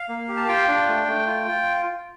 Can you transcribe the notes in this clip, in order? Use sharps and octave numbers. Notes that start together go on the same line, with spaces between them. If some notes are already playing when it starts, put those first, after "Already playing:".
Already playing: F5
A#3
G4
A5
F4 G5
D4
A3
A3
F4
F4